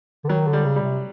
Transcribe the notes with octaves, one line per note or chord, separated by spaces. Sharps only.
D3
D#3 F#3
D3
G3
C#3
G3
C3